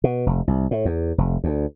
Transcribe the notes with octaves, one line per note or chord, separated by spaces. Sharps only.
B2
F1
C2
A2
E2
F1
D2